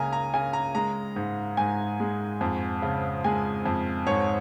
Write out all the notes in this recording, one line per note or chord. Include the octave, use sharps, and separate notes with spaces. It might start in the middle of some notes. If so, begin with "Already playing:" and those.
Already playing: C#2 C#3 A#3 G#5 A#5
A#5
C#3 G#5
A#5
G#3 A#5
G#2
G#2 G#5
G#3
F2
C#3
G#3 G#5
F2
G#2 C#5